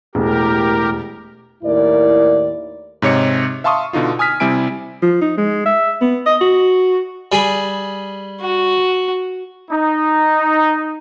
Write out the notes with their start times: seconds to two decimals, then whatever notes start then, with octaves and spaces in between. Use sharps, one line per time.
0.15 E1 A2 G4 A#4
1.64 D#2 A2 E4 A#4 D5
3.02 G#2 C3 C#5 D#5 C#7
3.64 E5 F5 A5 C6 C#6 D#6
3.93 B2 D3 D#4 F4
4.19 G#5 D#6 F6 B6
4.40 C3 G3 C4 E4 G#5 D7
5.02 F3
5.22 D#4
5.37 G#3
5.66 E5
6.01 B3
6.26 D#5
6.41 F#4
7.32 G3 G#4 B5
8.42 F#4
9.71 D#4